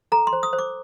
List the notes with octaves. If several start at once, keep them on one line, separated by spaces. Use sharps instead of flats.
A4 A#5
C6
C5
D#6
C5
D6